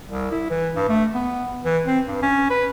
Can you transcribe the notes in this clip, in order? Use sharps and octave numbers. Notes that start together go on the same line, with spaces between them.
C2
E4
E3
G2
A3
B3
E3
C4
G2
C#4
B4